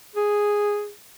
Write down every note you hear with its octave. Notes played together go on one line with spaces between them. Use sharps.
G#4